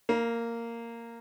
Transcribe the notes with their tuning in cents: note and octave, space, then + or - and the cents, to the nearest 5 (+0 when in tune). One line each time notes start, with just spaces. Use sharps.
A#3 -10 A#5 +30